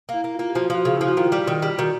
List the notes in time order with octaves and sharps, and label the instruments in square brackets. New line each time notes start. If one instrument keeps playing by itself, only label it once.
[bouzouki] A#3 [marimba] E4
[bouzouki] A#3
[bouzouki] A#3 [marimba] F4
[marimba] G4
[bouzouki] F3 [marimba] F#4
[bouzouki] F3
[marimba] F#4
[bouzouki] C#3
[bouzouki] F3 [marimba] E4
[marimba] F#4
[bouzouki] D#3 [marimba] F4
[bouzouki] G3
D#3
G3
[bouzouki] D#3 [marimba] F#4